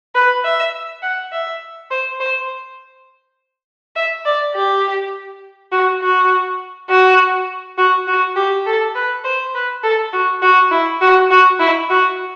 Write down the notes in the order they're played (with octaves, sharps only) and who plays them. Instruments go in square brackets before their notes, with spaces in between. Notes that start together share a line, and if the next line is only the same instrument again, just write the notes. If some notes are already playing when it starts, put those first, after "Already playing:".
[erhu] B4
E5
F#5
E5
C5
C5
E5
D5
G4
F#4
F#4
F#4
F#4
F#4
G4
A4
B4
C5
B4
A4
F#4
F#4
E4
F#4
F#4
E4
F#4